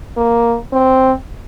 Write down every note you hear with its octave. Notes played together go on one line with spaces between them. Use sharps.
A#3
C4